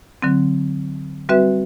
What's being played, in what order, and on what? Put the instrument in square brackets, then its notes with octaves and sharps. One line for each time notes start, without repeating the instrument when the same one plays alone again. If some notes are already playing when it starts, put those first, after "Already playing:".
[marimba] D3 F#3 C4
G3 C4 F#4 B4 E5